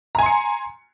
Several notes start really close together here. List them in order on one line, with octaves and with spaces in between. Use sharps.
A#5 G#5 C6 C#7